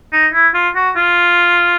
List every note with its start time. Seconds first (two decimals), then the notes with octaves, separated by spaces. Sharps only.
0.13 D#4
0.34 E4
0.54 F4
0.76 F#4
0.96 F4